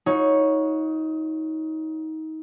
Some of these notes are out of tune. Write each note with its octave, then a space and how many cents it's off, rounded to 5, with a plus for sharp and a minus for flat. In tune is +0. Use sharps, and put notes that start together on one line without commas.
D#4 +25 F#4 -40 C#5 +0